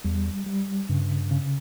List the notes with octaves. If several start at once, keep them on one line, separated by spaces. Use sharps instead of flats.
E2 G3
G3
G2 C#3
C#3